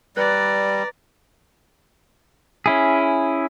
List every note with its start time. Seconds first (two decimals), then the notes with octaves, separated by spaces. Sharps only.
0.17 G3 B4 D5 A#5
2.66 C#4 E4 G#4